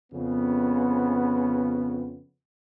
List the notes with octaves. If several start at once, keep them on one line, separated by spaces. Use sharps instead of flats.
F2 C#3 B3